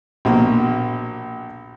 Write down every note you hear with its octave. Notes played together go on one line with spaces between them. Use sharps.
A#1 B2 A#3